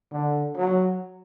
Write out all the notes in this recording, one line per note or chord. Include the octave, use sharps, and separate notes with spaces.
D3
F#3